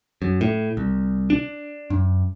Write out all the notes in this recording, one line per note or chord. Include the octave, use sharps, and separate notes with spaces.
F#2
A2
C2
D4
F#2